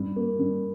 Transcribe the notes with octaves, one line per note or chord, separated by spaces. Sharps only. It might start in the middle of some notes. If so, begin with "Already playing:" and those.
Already playing: G2
A#3
G2